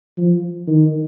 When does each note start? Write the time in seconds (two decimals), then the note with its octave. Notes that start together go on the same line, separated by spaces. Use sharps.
0.18 F3
0.68 D#3